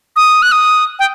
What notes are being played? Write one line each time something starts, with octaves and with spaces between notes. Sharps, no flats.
D#6
F#6
D#6
G5